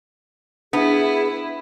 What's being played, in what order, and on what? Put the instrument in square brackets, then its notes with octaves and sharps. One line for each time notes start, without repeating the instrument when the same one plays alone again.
[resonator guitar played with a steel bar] B3 [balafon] D4 [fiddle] E4 [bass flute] G#4